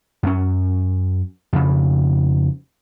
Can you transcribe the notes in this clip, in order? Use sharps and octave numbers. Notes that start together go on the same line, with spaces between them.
F#2 C#4
F2 C#3